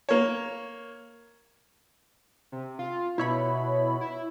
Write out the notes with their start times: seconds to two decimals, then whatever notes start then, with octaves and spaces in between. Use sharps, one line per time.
0.09 A#3 C#5
2.52 C3
2.79 F4
3.18 B2 E4 C#5 B5
4.01 E4